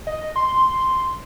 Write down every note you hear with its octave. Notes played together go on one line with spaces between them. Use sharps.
D#5
C6